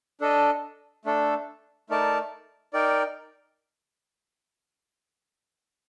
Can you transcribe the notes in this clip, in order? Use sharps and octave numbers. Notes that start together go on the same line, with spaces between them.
D4 A4 D#5
A3 D4 A4
A3 D#4 A#4 D5 A5
D#4 A#4 D5 G5